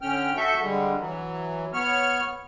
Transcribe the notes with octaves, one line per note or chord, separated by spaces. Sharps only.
D3 C#4 G5 F6
F#4 A4 E5 C#6 G6
D3 G3 G#3
E3 F#3
B3 C#5 F6